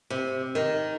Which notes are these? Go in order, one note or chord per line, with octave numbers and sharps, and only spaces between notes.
C3
D#3